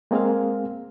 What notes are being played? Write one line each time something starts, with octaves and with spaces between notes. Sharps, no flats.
G#3 A#3 C4 G#4 A#4 F5